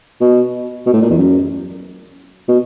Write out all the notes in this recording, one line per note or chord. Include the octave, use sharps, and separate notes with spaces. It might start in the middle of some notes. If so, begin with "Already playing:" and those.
B2
B2
A2
A#2
E2
F#2
B2